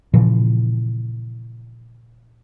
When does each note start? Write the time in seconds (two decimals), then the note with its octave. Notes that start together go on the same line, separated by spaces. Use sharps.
0.13 A#2 C#3 E3 F3